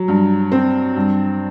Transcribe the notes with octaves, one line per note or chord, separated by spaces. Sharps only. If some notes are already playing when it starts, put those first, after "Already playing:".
Already playing: F#3
G2
C4
G2